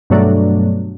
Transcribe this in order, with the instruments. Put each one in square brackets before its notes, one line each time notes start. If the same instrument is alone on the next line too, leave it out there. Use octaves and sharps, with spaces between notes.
[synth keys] G2 B2 F#3 A3 D4